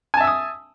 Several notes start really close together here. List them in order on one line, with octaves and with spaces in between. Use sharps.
G#5 A5 E5 E6 D#6